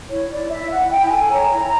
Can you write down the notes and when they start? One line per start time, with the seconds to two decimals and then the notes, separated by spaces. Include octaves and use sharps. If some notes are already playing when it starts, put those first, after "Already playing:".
0.10 E4 C#5
0.30 E4 D5
0.50 E4 E5
0.71 E4 F#5
0.91 E4 G5
1.11 A4 G#5
1.31 C#5 A#5
1.52 E4